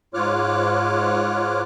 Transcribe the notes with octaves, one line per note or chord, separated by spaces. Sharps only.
G#2 F4 C#5 D6 F6 F#6